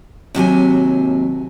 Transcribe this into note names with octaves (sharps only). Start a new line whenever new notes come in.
D#2 C3 F#3 G#5